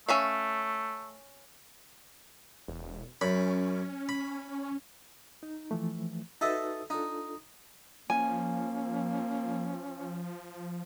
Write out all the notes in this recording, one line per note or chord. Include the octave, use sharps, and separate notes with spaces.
A3 C#4 E5 F5
E1
F#2 C#4 B5
B5
D#4
E3 F3 A3
D#4 F#4 A4 B4 D#5 E5
D4 D#4 F4 A4
F3 A#3 C#4 G#5